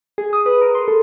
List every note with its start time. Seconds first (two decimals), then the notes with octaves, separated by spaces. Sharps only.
0.18 G#4
0.33 D#6
0.46 B4
0.61 A#4
0.75 C6
0.88 A4